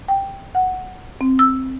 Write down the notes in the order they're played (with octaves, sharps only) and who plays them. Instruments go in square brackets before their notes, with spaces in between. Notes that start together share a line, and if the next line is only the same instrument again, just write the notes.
[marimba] G5
F#5
C4
E6